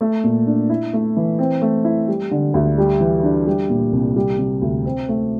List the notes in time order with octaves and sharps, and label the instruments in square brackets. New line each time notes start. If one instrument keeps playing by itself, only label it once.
[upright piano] A3
A#2
D4
E4
A3
E3
C4
A3
E4
G3
D3
D2
G3
E3
D4
G3
A#2
C2
G3
C3
D2
C4
A3